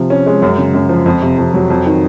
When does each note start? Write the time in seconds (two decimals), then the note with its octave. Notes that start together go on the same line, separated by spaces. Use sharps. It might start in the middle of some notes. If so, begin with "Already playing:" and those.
Already playing: C3 F3
0.10 C#4
0.26 G#3
0.42 F#2
0.58 C#3
0.74 F#2
0.89 F3
1.06 F2
1.22 C3
1.38 F2
1.54 F#3
1.70 F2
1.86 D#3